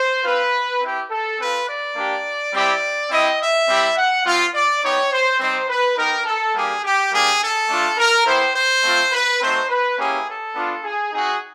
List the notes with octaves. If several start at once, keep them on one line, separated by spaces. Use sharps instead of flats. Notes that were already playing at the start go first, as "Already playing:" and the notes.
Already playing: C5
C4 F4 B4
C4 E4 G4
A4
C4 F4 B4
D5
A#3 D4 G4
G3 C4 E4 G4 D5
C4 E4 G4 D#5
E5
G3 C4 E4 G4
F#5
G3 C4 F4
D5
B3 D#4 G4 C#5
C5
G3 C4 D#4 C5
B4
B3 D#4 G4 A#4
A4
G3 A#3 D4 G4 G#4
G4
G3 A#3 D4 G4 G#4
A4
A3 D4 F4
A#4
B3 E4 G4 C5
C5
A3 C4 F4
B4
A3 C4 D#4 F#4 C5
B4
A#3 C#4 E4 G4 G#4
A4
B3 D4 F4
G#4
C4 D#4 F#4 G#4